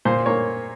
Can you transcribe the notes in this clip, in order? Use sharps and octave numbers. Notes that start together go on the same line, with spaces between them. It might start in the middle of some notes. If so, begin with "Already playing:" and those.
A#2 C5
A#3 C#5